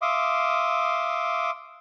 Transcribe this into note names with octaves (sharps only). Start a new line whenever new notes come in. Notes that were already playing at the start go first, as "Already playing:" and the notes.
E5 F5 C6 D6 D#6